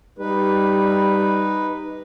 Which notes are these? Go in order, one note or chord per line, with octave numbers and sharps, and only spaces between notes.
G3 D#4 B4